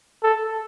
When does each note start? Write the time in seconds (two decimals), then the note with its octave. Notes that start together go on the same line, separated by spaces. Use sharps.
0.23 A4